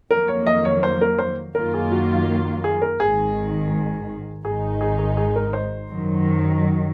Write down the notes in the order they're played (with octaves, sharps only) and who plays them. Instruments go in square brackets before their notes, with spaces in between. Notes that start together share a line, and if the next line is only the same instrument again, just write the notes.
[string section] F2 D#3 F#3 A#3 [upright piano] A#4
[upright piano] C#5
D#5
C#5
C5
A#4
C5
[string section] F#2 D#3 F#3 A#3 F4 [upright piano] A#4
[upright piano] G#4
F#4
G#4
A#4
[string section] G#1 G#2 D#3 [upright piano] G#4
[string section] G#1 G#2 D#3 G#3 D#4 [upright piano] G#4
[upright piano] G#4
G#4
G#4
A#4
C5
[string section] F#2 D#3 F#3